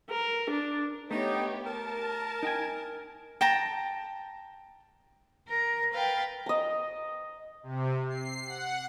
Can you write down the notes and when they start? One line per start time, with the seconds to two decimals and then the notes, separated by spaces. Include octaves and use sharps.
0.10 A#4
0.50 D4
1.11 A3 B3 D#4 G4 C#5
1.66 A#4 A5
2.43 D#4 G5 G#5
3.41 G5 A5 A#5
5.47 A#4
5.92 B4 F5 G5 A6
6.46 D#5 A#5
7.63 C3
8.09 C7
8.47 F#5